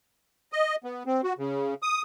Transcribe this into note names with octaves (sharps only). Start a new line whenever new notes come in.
D#5
B3
C4
F#4
C#3
D#6